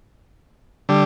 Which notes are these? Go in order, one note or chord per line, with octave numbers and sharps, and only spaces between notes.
D3 G3